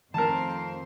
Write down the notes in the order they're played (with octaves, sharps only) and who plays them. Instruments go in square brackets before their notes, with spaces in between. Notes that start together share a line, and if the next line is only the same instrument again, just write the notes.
[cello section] F2 C4 C5 [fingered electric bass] D#3 A3 [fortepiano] A#4 A5